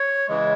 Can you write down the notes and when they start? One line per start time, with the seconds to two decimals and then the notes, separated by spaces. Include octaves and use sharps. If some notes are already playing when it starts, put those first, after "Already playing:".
Already playing: C#5
0.28 C#3 E3 G#3